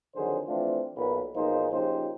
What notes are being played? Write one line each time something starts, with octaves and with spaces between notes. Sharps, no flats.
F2 D3 D#3 F#3 G#4 C5
E3 F3 A3 C4 D4 F4
B1 A#2 B4
B1 F3 A#3 D#4 G#4 C5
A#2 C#3 F3 D#4 G4 C5